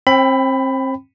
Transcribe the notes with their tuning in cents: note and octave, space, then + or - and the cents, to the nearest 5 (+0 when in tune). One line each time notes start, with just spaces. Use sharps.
C4 +30 G5 +0 B5 +15